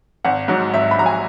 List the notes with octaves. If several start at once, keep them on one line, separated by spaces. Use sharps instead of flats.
G#1 F#5
G#2 F#3
G#1 E5
B5
G#2 F#3 A#5
G#5